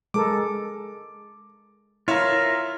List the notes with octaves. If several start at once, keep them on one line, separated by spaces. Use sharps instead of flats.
G#3 A4 A#4 D6
E4 F4 A#4 C#5 E5 F5